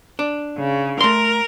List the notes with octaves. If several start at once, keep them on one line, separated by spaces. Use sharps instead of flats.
D4
C#3
A3 A#4 C6